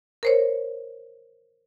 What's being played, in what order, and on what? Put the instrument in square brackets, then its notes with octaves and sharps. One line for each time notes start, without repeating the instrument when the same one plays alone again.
[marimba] A#4 C5 C#5